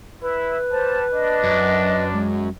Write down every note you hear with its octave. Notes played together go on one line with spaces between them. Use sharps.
E4 B4
G3 C5 A5
D4 D#5
F#2
G#3